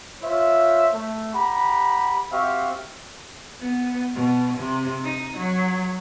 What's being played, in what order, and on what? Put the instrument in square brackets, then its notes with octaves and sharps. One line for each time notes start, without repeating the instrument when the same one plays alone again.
[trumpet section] F4 C5 C#5 E5
A3
G4 F#5 A#5 B5
C4 F#4 G4 E5 F5 C#6
[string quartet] B3
B2
C3
D#4
F#3